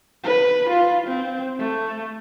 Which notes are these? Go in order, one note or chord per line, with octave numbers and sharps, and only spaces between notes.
B4
F4
C4
A3